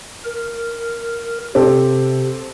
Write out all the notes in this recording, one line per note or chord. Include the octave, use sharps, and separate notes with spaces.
A#4
C3 C4 G4 A4